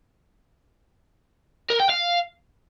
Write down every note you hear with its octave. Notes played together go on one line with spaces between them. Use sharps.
A#4
G5
F5